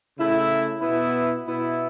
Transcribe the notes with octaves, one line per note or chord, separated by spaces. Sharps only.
C#3 A3 E4
B2 B3 E4
B2 B3 E4